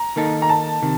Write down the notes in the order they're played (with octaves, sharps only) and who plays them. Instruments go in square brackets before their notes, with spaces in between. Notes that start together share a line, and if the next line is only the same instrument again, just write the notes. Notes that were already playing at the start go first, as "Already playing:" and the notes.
Already playing: [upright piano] A#5
[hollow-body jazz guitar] D#3 A#3 D#4 A4
[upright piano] A#5
A5
[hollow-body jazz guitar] C3 D#3